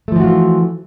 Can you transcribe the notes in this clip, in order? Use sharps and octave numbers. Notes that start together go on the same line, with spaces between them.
E3 F3 A3 F4 F#4